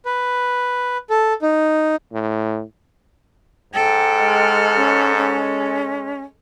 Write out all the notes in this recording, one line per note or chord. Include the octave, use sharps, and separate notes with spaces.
B4
A4
D#4
A2
G#2 A4 G5
G#3 F6
C#4
G#3 C#4